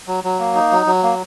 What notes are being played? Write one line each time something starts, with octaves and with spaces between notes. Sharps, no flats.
F#3
F#3
A#3
D#4
F#3
F#3
A#3